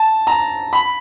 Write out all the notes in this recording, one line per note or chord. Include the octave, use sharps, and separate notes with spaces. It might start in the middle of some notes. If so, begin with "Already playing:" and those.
Already playing: A5
A#5
B5